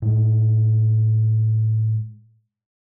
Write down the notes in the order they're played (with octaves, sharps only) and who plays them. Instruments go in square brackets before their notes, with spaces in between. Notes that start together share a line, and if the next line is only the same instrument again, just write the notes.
[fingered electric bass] A2 G#3